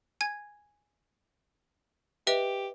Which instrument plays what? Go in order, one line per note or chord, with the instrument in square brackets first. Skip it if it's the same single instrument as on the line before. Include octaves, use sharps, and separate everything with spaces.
[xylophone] G#5 G#6
[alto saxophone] G4 [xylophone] B4 D#5 E5